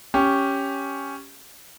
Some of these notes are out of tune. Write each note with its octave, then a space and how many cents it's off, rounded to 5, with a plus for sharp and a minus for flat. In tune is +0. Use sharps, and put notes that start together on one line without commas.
C#4 +0 G4 +0